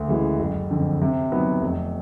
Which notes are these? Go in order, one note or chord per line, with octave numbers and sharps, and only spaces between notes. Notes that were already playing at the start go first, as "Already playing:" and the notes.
Already playing: D2
C#3 E3 G#3
F#1
F2 D3
C3
D#3 F#3 B3
F1